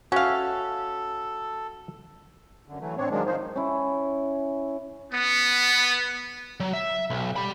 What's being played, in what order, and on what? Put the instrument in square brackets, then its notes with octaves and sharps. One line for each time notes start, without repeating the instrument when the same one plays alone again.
[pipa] C#4 F5 [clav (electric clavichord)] F#4 E5 [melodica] A4
[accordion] F#2 D3
E3 F#3 A3
A2 C4 D4 C#5
D#3 F3 F#3 G#3 D4
D#3 F3 D#4 C5
[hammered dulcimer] C#4 E4
[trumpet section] B3
[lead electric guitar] F#3
E5
B1
G4 B5